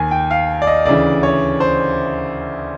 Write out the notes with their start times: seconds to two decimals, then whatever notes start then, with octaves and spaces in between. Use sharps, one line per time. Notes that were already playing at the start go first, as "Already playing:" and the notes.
Already playing: D#2 D#3 G#5
0.11 G5
0.31 F5
0.62 D5
0.67 D#5
0.86 D2 C#3 E3 D5
1.23 C#5
1.60 C5